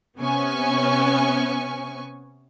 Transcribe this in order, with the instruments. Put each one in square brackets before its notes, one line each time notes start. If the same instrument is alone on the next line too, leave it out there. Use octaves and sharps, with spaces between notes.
[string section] C3 B3 C#4 G#5 C#6